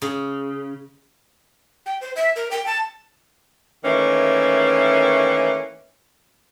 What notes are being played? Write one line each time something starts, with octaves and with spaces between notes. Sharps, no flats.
C#3
G5
C5
E5
A#4
G5
A5
D#3 E3 A3 A#3 C#4